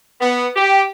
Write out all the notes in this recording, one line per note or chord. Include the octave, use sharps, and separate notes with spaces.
B3
G4